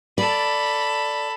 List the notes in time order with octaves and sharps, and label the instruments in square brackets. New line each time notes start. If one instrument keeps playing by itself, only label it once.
[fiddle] A4 B5 [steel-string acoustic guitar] D5